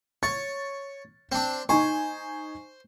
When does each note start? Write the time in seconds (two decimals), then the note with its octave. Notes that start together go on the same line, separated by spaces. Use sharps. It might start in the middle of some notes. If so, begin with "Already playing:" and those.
0.23 C#5 A6
1.32 C4 D4
1.69 D#4 C5 G#5 C#6